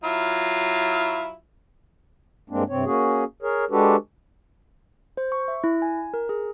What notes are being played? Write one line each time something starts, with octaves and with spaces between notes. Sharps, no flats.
F#3 E4 F4
G2 G#3 A#3 C4 D4
G2 C3 C4 C#5
A#3 C#4 F#4 G#4
G#4 A#4 C#5
G#3 D4 F#4 G4 A4 B4
C5
C#6
E5
E4
G#5
A#4
G#4